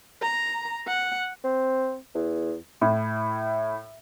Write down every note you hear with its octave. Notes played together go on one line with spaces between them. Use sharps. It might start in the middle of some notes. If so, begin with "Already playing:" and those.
A#5
F#5
C4
E2
A2